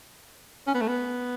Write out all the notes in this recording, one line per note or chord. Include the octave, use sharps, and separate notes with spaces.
C#4
B3
A3
B3